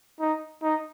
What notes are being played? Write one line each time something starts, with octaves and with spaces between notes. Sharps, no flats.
D#4
D#4